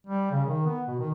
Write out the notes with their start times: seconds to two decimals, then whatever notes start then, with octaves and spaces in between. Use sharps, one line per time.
0.07 G3
0.31 C#3
0.47 D#3
0.66 B3
0.88 B2
0.99 D#3